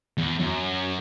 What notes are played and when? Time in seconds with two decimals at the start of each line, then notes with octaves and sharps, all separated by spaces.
0.18 E2
0.40 F#2